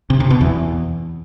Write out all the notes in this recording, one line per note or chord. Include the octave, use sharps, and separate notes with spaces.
C3
C3
B2
E2